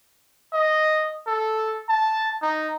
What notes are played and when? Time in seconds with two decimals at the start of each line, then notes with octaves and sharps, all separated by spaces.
0.53 D#5
1.27 A4
1.89 A5
2.42 D#4